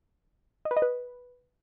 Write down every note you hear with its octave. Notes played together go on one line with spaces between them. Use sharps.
D#5
B4
D#5
B4